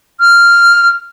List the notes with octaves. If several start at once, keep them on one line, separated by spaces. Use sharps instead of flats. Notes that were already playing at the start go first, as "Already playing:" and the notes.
F6